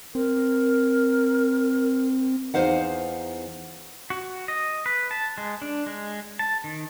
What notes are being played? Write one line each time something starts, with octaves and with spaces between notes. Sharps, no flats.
C4 A#4
E2 G#2 D#4 C5 F5 F#5
F#4
D#5
B4
A5
G#3
D4
G#3
A5
D#3